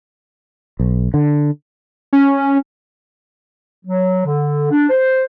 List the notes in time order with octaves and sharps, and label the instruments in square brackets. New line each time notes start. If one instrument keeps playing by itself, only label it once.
[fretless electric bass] B1
D3
[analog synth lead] C#4
[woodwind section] F#3
D3
D4
C5